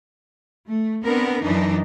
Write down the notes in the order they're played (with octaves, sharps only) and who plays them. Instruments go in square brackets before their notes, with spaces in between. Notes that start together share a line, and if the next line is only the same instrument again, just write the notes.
[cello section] A3
B3 C4 D4 A#4
F#2 E3 D4 D#4